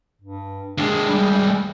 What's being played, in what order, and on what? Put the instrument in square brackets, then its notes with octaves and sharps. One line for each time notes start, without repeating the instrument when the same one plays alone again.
[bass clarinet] G2
[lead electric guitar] D#2 G#3 [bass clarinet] D4
[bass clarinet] G3